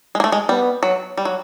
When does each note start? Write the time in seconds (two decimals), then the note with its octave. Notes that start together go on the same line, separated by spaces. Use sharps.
0.15 G#3
0.20 A#3
0.24 A3
0.32 G#3
0.49 G3 B3
0.83 F#3
1.17 G3
1.25 F#3